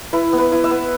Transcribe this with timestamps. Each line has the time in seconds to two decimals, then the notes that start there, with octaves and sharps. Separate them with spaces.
0.13 E4 B4
0.33 B3
0.38 B4
0.52 E4
0.64 E5
0.71 B3